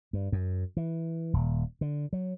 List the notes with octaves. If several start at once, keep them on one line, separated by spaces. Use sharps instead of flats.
G2
F#2
E3
D#1
D3
F#3